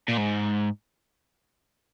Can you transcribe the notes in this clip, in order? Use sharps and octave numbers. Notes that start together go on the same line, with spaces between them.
A#2
G#2